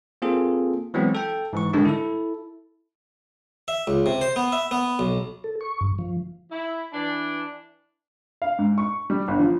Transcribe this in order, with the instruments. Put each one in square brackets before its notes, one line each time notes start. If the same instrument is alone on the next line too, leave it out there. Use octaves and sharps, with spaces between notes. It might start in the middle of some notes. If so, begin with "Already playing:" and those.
[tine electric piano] A#3 C4 F4 G#4 A4
E3 F#3 G#3 B3 C4
A4 G5
G#2 E3 C#6
G#2 D3 D#3 G3 G#3 D4
E4 A4
[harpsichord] E5
C#2
C3
C5
B3
E5
B3
B1
[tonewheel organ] A4
C#6
G2
F3
[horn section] E4
E3 D4
[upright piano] F5
G#2
C#6
G3
G1
F3